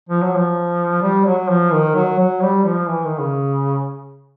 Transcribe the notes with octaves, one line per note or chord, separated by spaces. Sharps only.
F3
F#3
F3
G3
F#3
F3
D#3
F#3
F#3
G3
F3
E3
D#3
C#3